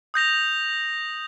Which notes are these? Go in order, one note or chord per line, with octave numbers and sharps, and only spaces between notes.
D#6 G6 A#6 F7